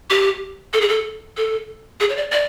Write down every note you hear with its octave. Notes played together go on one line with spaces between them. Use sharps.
G4
A4
G#4
A4
A4
G#4
C#5
D5
D5